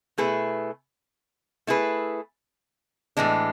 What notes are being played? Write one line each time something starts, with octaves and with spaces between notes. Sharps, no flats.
B2 A3 E4 G#4 B4
A3 E4 G#4 B4
A2 E3 G#3 D4